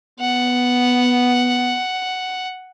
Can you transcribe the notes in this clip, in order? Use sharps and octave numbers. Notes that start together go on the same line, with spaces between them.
B3 F#5